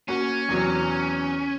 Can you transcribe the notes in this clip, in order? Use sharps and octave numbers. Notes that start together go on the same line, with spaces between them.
A#3 C#4 F#4
E2 C3 F#3